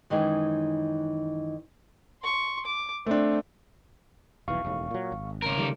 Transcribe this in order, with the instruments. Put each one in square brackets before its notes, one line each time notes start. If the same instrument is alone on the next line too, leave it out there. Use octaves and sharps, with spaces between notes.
[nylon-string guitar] F#2 D#3 E3 G#3 D#4 G#4
[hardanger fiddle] C6 C#6
D6
[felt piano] A3 D4 [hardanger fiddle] C4
[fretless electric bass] D#1 B1 E3 [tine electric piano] F5 C#6
[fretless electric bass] E1 D#2 A2
A#2 F#3
G#1
[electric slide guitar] C#3 A#4
[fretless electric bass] D#3 G3 A3